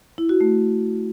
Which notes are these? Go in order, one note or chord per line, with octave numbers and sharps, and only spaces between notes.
E4
F#4
A3